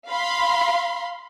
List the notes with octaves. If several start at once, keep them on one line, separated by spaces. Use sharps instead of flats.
F5 B5 C6